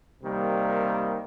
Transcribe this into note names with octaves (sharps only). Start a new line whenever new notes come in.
C3 D#3 G3 A#3